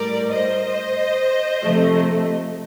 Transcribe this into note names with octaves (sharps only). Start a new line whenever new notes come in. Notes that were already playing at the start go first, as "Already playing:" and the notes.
Already playing: A2 G3 A#4 D5
C5 D#5
C3 F3 A3